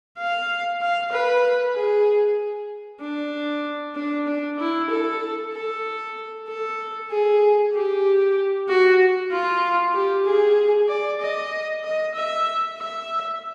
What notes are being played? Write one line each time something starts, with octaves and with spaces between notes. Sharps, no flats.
F5
F5
B4
G#4
D4
D4
D4
E4
A4
A4
A4
G#4
G4
F#4
F4
G4
G#4
D5
D#5
D#5
E5
E5